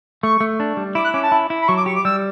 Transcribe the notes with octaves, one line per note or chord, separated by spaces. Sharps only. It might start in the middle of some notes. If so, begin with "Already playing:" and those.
A3 C#6
A3
D4
G3
E4 D6
F#6
C#4 D6
A5
E4
E4
B5
F#3 C#6
D6
G4 C#6
D6
G3 E6